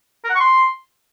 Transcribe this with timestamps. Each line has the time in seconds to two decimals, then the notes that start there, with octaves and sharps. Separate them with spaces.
0.24 A#4
0.30 F#5
0.35 C#6
0.40 C6